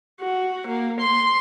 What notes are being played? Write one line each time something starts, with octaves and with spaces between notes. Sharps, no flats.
F#4
A#3
C6